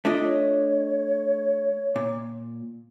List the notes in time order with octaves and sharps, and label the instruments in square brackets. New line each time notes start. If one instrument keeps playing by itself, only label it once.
[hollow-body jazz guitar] A3 D4 D#5 [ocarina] F4
[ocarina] C#5
[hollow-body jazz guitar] A#2